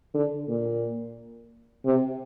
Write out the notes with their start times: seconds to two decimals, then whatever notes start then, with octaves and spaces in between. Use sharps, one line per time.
0.14 D3
0.48 A#2
1.85 C3